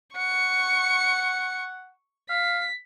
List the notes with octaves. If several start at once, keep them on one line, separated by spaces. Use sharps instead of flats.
F#5 C#6 C#7
F5 B6